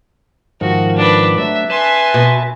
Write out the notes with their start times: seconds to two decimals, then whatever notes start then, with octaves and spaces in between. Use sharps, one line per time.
0.61 G#2 D#3 F3 F#4
0.97 D4 B4
1.38 F#3 A3 D4 E5
1.70 B4 E5 G#5 A5 C6
2.14 B2